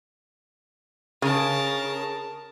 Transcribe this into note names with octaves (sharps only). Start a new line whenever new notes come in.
C#3 A#4 A5